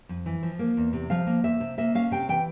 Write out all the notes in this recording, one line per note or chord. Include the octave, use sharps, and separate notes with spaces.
F2
E3
F3
A#3
E2
C3
F3 F5
A#3
E2 E5
C3
A#3 E5
C#4 F5
C3 G5
E3 G5